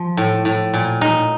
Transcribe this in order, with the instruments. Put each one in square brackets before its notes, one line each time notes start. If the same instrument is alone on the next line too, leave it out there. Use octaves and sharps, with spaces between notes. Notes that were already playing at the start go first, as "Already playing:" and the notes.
Already playing: [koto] F3
A2
A2
A#2
D#4